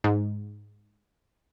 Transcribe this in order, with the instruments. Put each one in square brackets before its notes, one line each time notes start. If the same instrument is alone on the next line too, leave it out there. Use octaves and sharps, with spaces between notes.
[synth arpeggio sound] G#2